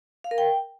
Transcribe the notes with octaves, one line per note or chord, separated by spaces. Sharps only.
F5
A#4
G5